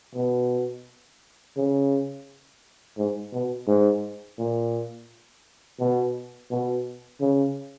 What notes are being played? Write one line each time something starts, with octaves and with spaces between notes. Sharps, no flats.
B2
C#3
G#2
B2
G#2
A#2
B2
B2
C#3